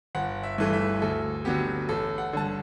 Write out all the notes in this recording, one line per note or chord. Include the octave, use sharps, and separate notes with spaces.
G1 F#5
E5
G2 E3 A3
E5
D2 A4
D3 F#3 B3 G4
A1 A4
F#5
G2 D3 A5